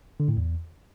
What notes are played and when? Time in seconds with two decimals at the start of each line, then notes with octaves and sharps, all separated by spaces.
0.20 D3
0.28 A2
0.37 E2